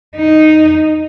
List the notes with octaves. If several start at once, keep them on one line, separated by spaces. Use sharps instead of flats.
D#4